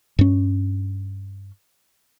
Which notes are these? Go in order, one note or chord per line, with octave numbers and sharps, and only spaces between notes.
G2 C#4